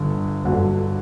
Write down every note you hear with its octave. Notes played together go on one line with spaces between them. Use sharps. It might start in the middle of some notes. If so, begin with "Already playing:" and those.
Already playing: G1 G2 D3
G1 G2 D3 F#3